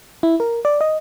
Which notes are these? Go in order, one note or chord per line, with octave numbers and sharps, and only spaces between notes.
E4
A#4
D5
D#5